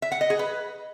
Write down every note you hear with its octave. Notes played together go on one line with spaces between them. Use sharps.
E5
F#5
D#5
G#4
B4